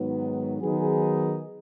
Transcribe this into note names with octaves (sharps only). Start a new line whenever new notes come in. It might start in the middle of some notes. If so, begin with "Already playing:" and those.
Already playing: G#2 D#3 F#3 B3
D#3 F#3 B3 D#4 G#4